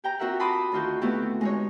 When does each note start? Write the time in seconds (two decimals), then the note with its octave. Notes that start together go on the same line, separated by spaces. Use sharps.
0.04 G4 G5 A#5
0.19 C4 F4 F#4 A#4 E5 F#5
0.40 A5 B5 C6 D6 D#6
0.72 D2 D#3 F4 F#4 G6
1.01 A3 B3 C4 E4 F#4 G4
1.41 G#3 D#4 C#5